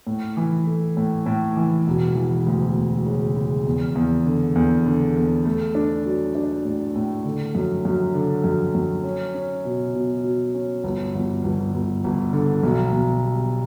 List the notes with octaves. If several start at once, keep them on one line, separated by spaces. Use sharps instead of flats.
A2
E3
A3
A2
A2
E3
E1
E3
D2
E1
C#3
C#3
E2
E2
D3
E2
D3
E2
A3
D4
F#3
D4
A2
A2
D3
F#2
F#2
D3
F#2
F#2
C#4
C#4
B2
B2
F#3
C#4
G1
G1
G1
G1
G1
D3
B1
B1
G3